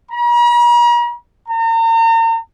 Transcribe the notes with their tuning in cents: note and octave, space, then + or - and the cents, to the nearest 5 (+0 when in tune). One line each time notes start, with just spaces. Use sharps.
A#5 +45
A#5 -40